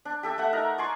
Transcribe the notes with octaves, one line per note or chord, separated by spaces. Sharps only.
D4
G4 A4 E5
A3 F#5
D#4 A#4 A#5
D5 G#5 C6 C#6